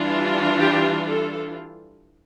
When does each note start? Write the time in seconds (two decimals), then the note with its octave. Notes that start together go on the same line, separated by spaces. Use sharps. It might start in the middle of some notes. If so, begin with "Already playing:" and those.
Already playing: E3 G3 D4 F4
0.60 G4
1.08 A4